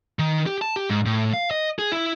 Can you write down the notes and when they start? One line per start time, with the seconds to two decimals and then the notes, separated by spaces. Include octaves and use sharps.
0.19 D#3
0.46 G4
0.62 A5
0.76 G4
0.90 G#2
1.06 A2
1.34 F5
1.51 D#5
1.79 G#4
1.92 E4